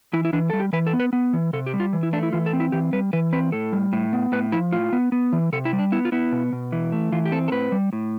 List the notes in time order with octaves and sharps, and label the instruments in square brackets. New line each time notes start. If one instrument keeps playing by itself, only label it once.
[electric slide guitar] E3 E4
E4
E3 D4
G3 A4
G4
E3 B4
A4
B3
B4
B3
E3
C3 A4
G4
G3
F4
E3
E4
A3 D4
E4
E3 F4
A4
C4
E4
E3 G4
G3 B4
E3 B4
C4 B4
A2 A4
G3
A2
B3
A2 B4
F3 E4
A2 F4
B3
B3
E3
C3 A4
E4
G3
D4
B3 E4
F4
B3 E4
B2
B2
E3
A3
E3 F4
G4
C4 A4
A4
A2 B4
G3
A2